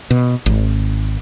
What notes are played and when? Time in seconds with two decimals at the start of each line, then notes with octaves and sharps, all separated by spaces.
0.11 B2
0.46 G#1